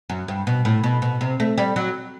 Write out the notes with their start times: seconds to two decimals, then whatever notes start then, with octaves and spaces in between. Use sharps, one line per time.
0.10 F#2
0.28 G2
0.47 B2
0.65 A2
0.84 B2
1.02 B2
1.21 C3
1.40 A3
1.58 G3
1.76 F#3